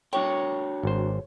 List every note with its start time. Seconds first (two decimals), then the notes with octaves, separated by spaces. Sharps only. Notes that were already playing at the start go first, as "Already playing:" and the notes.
0.13 D4 F#4 C#5 G5
0.83 G#1 C5